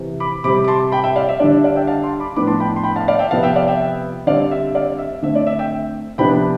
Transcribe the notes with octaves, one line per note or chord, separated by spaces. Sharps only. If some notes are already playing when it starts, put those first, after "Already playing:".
Already playing: C3 E3
B5 D6
C3 G3 C4 B5 D6
D6
A5 C6
G5 B5
E5 G5
D5 F5
E5
D3 G3 D4 D5
E5
D5 F5
E5 G5
F5 A5
A5 C6
B5 D6
A2 F3 B3 D4 B5 D6
A5 C6
G5 B5
C6
G5 B5
F5 A5
D5 F5
E5 G5
C3 F3 B3 F5 A5
E5 G5
D5 F5
E5 G5
D3 G3 C4 D5 F5
E5
D5 F5
E5
D3 A3 C4 E5
D5
E5
E5 G5
C3 F3 B3 D4 G5 B5